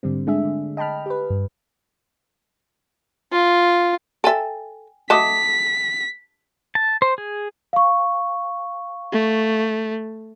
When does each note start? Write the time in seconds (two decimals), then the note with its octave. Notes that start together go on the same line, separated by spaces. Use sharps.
0.03 G#2 D3 G3 C4
0.27 G#3 A3 D4 G#4 E5
0.45 D3
0.77 D#5 G5 A5 B5 F6
1.06 G4 B4
1.30 G2
3.32 F4
4.24 A4 E5 G5 G#5 A6
5.10 A3 F#4 D#5 A5 D6 D#6 B6
6.75 A5
7.02 C5
7.18 G#4
7.73 F5 C#6
9.12 A3